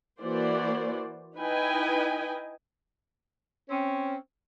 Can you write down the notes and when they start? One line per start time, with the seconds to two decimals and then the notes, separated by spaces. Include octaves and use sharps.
0.21 E3 A#3 F#4 C5 D5
1.38 D#4 E4 B4 D#5 G5 G#5
3.69 C4 C#4